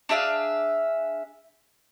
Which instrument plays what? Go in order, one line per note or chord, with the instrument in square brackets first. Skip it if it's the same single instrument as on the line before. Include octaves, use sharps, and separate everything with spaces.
[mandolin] D4 G#4 E5 F5